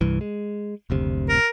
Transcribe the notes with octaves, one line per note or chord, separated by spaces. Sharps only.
C2 G2 E3
G#3
F#1 D2 C3
A#4